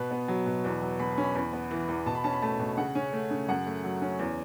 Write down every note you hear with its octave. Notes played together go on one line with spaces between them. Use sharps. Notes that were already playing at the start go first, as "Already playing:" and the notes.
Already playing: B2 B4
B3
F#3
B2
E2 B4
F#3
B2 B5
B5
C#4
B5
E2 B5
B3
E3
E2
B2 A5
B5
C#4 A5
B5
A3 A5
B2
C#3 F#5
C#4
A3
C#3
F#2 F#5
A3
F#3
C#4
E2